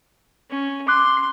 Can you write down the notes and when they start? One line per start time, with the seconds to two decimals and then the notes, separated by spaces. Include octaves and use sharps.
0.50 C#4
0.88 C6 D6 F#6